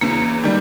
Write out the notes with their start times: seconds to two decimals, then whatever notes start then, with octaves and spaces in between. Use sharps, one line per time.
0.01 E2 C#3 E3 A#3
0.44 D#3 G3